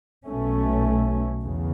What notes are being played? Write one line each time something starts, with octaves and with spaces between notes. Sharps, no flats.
B1 B2 A3 C#4
E2 C#3